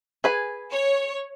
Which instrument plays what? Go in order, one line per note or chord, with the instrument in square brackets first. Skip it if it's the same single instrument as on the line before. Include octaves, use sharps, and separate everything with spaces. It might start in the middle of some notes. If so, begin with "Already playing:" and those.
[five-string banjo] G#4 B4 G#5
[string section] C#5